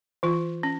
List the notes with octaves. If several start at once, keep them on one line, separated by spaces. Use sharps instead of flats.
E3 F4
C#4